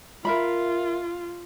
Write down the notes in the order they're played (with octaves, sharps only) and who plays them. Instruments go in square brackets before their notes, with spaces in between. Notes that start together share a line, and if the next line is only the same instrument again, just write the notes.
[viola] F4 [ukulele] A#4 E5 B5